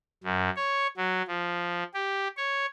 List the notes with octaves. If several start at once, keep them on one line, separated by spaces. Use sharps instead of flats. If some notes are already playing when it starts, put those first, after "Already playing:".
F#2
C#5
F#3
F3
G4
C#5